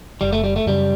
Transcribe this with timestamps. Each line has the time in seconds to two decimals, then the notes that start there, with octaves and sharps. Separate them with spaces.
0.21 F#1 G3
0.33 A3
0.44 G3
0.56 A3
0.66 F#2 C#3 G3